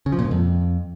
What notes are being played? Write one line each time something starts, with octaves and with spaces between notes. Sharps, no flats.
C#3
F3
A#2
G#2
F2